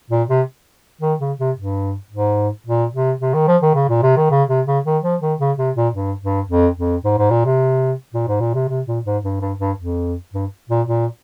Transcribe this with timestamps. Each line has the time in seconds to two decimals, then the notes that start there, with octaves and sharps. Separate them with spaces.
0.10 A#2
0.29 C3
1.01 D#3
1.20 C#3
1.39 C3
1.57 G2
2.11 G#2
2.66 A#2
2.94 C3
3.21 C3
3.34 D#3
3.48 F3
3.62 D#3
3.75 C#3
3.89 A#2
4.03 C3
4.17 D#3
4.31 C#3
4.49 C3
4.66 C#3
4.85 D#3
5.03 F3
5.21 D#3
5.39 C#3
5.58 C3
5.76 A#2
5.94 G2
6.22 G2
6.49 F2
6.77 F2
7.04 G#2
7.18 G#2
7.31 A#2
7.45 C3
8.14 A#2
8.28 G#2
8.41 A#2
8.54 C3
8.68 C3
8.87 A#2
9.05 G#2
9.24 G2
9.41 G2
9.59 G2
9.77 F2
10.33 G2
10.69 A#2
10.87 A#2